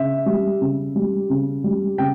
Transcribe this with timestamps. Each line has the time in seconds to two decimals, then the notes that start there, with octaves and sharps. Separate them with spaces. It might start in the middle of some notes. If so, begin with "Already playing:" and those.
Already playing: C#3 E5
0.26 G3
0.61 C#3
0.96 G3
1.30 C#3
1.64 G3
1.98 C#3 G5